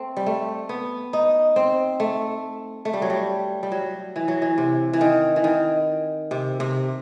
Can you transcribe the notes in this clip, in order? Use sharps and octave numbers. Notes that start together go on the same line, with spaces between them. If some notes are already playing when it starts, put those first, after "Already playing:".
Already playing: A3 C4
G3
A3
B3
D#4
C4
A3
A3
G3
F#3
G3
G3
F#3
E3
F#3
E3
C3
E3
D#3
E3
D#3
C3
C3